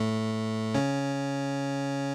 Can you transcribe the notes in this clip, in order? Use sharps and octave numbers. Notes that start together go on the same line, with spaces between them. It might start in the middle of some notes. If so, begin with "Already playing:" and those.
Already playing: A2 A3
C#3 C#4